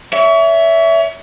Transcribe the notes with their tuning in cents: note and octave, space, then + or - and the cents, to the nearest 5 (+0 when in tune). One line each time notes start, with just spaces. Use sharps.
C#5 +35 E5 +0